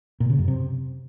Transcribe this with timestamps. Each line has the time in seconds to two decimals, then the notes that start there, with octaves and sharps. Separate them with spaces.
0.20 A#2
0.30 C#3
0.39 F#2
0.48 C3